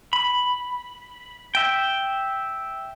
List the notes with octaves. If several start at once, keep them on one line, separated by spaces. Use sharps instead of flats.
B5
E5 G5